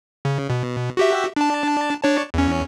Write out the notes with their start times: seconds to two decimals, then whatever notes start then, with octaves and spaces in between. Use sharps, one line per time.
0.25 C#3
0.50 B2
0.97 F#4 G4 E5
1.36 D4 A5
2.03 D4 C#5 A5
2.34 E2 C#4